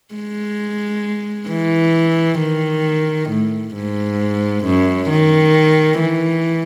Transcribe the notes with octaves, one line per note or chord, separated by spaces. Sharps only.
G#3
E3
D#3
A2
G#2
F#2
D#3
E3